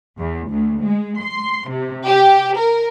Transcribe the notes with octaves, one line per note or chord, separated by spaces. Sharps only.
E2
D2
G#3
C6
C3
G4
A#4